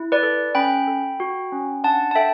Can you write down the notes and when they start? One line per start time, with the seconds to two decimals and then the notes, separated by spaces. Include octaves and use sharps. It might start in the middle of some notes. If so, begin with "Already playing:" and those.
Already playing: E4
0.12 B4 D5
0.23 A4
0.55 C#4 G5 B5
0.87 A4
1.20 F#4
1.52 C#4
1.84 D4 F#5 A5
2.11 A5
2.15 A4 E5 G5